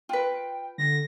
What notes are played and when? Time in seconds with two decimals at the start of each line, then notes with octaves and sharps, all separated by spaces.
0.09 F4 B4 G5
0.78 D3 A#6